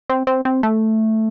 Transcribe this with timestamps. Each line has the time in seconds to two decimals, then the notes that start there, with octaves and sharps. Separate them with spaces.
0.10 C4
0.27 C4
0.45 C4
0.63 A3